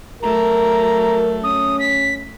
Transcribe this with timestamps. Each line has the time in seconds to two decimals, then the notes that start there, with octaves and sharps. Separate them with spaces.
0.23 F#3 A3 A#4 A#5
1.44 C#4 D#6
1.79 B6